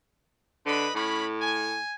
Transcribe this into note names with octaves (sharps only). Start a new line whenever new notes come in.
D3 B4 D#5 B5
A2 C#4 B5
G#5